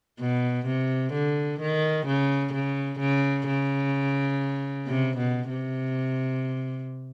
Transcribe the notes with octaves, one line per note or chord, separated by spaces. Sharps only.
B2
C3
D3
D#3
C#3
C#3
C#3
C#3
C3
B2
C3